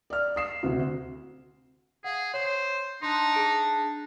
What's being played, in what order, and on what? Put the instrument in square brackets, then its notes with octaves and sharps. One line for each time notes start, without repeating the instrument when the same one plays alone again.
[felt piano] D5 F6
D#6 C7 E7
D2 C3 F#4
[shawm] G#4 [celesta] F5 F#5
[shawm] C5 [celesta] C#5 C7
[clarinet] D4 [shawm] D#4 [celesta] C6
[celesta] G#4 D7